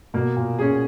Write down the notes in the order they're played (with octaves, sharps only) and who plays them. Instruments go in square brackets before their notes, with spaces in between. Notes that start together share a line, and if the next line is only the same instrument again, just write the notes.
[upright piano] B2 [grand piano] A#3
[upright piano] A#2
[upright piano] A#2 [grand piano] C#4 G#4